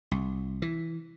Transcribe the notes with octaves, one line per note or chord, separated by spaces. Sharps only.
C2
E3